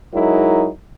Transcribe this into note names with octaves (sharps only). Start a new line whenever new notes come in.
F#3 G#3 D#4 E4 A#4